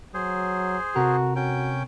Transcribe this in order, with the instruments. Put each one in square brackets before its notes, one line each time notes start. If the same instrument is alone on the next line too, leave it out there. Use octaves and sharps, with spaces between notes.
[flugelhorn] F#3 [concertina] G#4 C5
[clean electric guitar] C3 A4 A#4 [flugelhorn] F#4
[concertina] C#4 G5 [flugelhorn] F#4